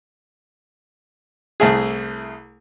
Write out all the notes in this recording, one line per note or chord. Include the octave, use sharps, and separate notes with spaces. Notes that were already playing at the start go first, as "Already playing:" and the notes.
C2 A3 G#4